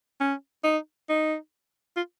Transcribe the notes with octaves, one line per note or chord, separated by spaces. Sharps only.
C#4
D#4
D#4
F4